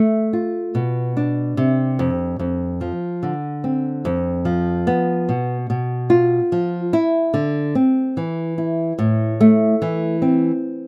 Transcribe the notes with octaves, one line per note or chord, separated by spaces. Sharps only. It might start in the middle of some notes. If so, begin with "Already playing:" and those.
Already playing: A3
F4
B2
D4
C3
F2
F2
F3
D3
C4
F2
F3
B3
B2
B2
F4
F3
E4
D3
C4
E3
E4
A2
A3
E3
C4